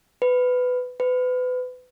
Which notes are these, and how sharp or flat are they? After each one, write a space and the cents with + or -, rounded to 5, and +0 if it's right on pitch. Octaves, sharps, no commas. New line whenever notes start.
B4 +15
B4 +30